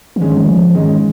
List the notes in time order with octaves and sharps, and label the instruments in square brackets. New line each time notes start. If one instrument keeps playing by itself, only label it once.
[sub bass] F3
[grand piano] G#2 G#3 C#4 [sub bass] D#3
[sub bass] D#3
F3
[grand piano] G#2 G#3 C#4 [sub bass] D#3